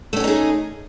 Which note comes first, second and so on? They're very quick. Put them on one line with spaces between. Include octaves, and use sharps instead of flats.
A3 C#4 F#4 D#4 G#4